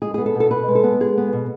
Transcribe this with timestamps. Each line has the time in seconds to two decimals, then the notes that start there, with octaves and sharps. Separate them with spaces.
0.02 G#3 G#4
0.14 B3 G#4
0.26 A4
0.35 B2
0.40 A4
0.50 B2 B4
0.68 G#3
0.75 A4
0.83 B3
1.00 G#3 G#4
1.17 B3
1.33 B2